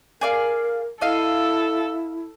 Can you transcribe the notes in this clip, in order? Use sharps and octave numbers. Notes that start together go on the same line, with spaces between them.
G#4 A#4 D5 F5
E4 A4 D#5 F5